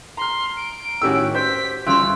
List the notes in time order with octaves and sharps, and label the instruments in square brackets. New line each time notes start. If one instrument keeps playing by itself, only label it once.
[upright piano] A#5 F6 [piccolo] C6
[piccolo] D7
[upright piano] A2 D#3 C#4 [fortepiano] F#4 G4 E6
[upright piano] C5 G6 [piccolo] B6
[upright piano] G1 F#6 D7 [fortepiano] C#3 [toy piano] F#4 C6 [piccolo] E6